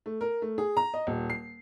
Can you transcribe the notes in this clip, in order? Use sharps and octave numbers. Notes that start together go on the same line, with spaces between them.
A3
A#4
A3
G#4
A#5
D#5
D#1
C7